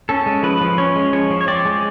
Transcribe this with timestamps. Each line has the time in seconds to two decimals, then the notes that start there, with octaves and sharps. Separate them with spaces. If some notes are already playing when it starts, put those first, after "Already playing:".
0.09 C#4 A4
0.26 G#3
0.43 F3 B4
0.61 F3
0.78 C#4 C#5
0.96 G#3
1.13 F3 C#5
1.30 F3
1.41 C#5
1.48 C4 D5
1.65 G#3